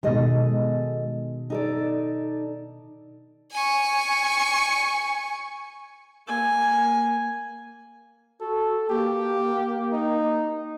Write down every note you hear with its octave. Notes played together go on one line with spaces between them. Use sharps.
B2 D#3 G#3 A4 D#5
D#4 A4 D5
G#5 C#6
A#3 G#5
F#4 A4
A#3 G4
D#4